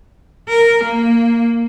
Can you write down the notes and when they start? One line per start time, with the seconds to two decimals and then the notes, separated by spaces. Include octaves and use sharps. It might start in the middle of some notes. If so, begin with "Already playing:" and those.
0.49 A#4
0.84 A#3